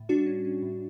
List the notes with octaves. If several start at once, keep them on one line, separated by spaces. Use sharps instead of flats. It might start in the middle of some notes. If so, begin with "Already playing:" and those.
Already playing: A2
G3 D4 F#4
C#4
C#4
A2